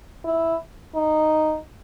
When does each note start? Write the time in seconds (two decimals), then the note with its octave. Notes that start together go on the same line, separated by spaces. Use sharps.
0.25 E4
0.95 D#4